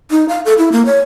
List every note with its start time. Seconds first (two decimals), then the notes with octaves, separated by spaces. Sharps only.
0.11 D#4
0.29 F5
0.45 A4
0.58 E4
0.72 A#3
0.85 C#5